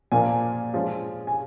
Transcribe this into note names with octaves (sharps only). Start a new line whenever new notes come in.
A#2 F3 A#3 G#5
F3 G#3 C#4
G#5